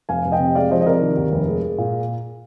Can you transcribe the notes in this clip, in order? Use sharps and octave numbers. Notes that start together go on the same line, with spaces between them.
F1 F5 G#5
F1
D#5 G5
C3
G#3 D5 F5
F3 C5 D#5
D#5
C3 A#4 D5
D#3
D#2
F1
G#3
G#3
A#2